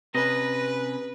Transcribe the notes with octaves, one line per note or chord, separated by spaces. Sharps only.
C3 C#4 B4 D#5